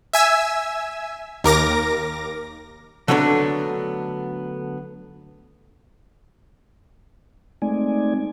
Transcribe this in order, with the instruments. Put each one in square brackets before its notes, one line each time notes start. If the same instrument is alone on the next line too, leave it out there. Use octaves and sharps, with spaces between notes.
[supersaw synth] E5 G#5 E6
D#2 A#4 D6 A#6
[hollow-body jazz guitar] D3 F#3 A3 B3 C#4 D4
[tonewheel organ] G#3 A3 C4 D#4 D5 G#5